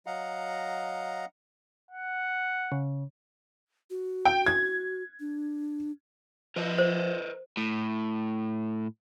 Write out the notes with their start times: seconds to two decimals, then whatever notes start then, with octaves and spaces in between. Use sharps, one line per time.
0.06 F#3 D#5 F5 F#5 A#5
1.91 F#5
2.72 C#3
3.90 F#4
4.25 G5
4.46 G#6
5.20 D4
6.56 F3 A#4 B4 D#5
6.78 C5
7.57 A2